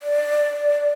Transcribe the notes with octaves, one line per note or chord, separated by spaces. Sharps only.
D5